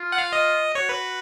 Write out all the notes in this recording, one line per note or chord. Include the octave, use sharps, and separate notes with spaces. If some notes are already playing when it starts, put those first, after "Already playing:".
Already playing: F4
F#5
F5
D#5
F#4 C#5
B4